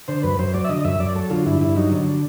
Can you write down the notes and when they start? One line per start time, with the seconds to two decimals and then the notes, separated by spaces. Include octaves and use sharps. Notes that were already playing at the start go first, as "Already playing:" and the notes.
0.08 D3 C5
0.23 F#2 B4
0.39 F#2 C5
0.54 F#3 D5
0.64 E5
0.69 D3 D#5
0.85 F#2 E5
1.00 F#2 D5
1.15 F#3 A4
1.30 D3 F4
1.46 G2 E4
1.61 G2 E4
1.76 F#3 D#4
1.91 D3